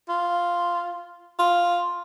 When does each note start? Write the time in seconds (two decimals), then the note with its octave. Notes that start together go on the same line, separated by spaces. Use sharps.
0.09 F4
1.39 F4